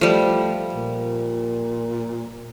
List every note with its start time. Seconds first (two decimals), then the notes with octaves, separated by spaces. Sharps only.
0.01 F3 G3 A3
0.73 A#2